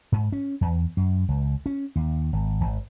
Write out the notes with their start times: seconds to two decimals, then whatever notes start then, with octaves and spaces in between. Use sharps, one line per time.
0.12 G#2
0.32 C#4
0.61 E2
0.97 F#2
1.29 C#2
1.66 C#4
1.96 D#2
2.33 G#1
2.61 G#1